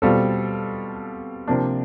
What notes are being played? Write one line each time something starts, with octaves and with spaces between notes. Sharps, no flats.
B2 G3 C4 F4 A4
C3 F3 A#3 D4